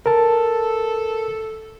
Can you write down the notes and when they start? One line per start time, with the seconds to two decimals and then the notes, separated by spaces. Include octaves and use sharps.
0.06 A4 A#4 A5